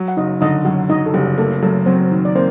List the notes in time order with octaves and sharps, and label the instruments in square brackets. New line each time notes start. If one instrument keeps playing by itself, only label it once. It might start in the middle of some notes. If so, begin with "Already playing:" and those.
Already playing: [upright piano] F#3
[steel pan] F#5
[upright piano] F#1 [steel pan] D#4 D#5
[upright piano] D3 [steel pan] D#4 D#5
[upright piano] F#2 [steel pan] F#4 F#5
[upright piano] F#3 [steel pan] D#4 D#5
[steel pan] A4
[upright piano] F#1 [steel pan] G3 G4
[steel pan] A3 A4 [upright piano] A#3
[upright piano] F#2 [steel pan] A3 A4
[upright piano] F#3 [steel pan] C4 C5
[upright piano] D#3
[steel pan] D5
[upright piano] A#3 [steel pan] C4 C5